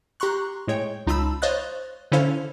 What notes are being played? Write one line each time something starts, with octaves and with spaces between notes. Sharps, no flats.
G4 A#5 C6 C#6 F#6
A2 G#3 C#5 G5
C#2 D#4 F4 A5 B5 E6
C5 C#5 D#5 F5 F#6 A6
D3 C#4 E4 A4 C5 F5